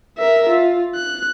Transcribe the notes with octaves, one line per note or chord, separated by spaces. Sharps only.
A#4 E5
F4
F#6